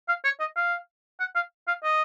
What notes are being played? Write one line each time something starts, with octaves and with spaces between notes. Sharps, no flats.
F5
C#5
D#5
F5
F#5
F5
F5
D#5